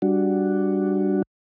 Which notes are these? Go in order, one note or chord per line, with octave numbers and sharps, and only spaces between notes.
G3 D4 F#4